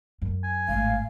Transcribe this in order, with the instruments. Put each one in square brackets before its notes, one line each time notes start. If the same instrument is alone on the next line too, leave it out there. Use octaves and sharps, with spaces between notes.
[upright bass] F#2
[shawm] G#5
[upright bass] G#1 A2 [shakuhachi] F5